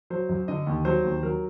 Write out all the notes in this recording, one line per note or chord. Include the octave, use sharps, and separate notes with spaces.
F#3 C5
F#2
D3 D#5
D#2
F#3 C5
D#2
F#3 A#4